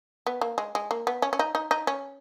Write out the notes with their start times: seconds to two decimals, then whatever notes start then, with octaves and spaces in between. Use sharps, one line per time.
0.27 B3
0.41 A#3
0.58 G#3
0.75 G#3
0.91 A#3
1.07 B3
1.22 C#4
1.33 C#4
1.39 D#4
1.55 D#4
1.71 D#4
1.87 C#4